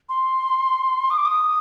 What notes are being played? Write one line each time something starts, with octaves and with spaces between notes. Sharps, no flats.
C6
D#6
D6
D#6